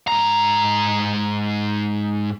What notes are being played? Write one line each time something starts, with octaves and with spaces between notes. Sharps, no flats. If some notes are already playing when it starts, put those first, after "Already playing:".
G#2 A#5